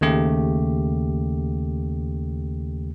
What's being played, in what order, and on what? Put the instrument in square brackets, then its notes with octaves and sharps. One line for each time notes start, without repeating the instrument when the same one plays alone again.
[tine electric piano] D#2 C#3 A3 G4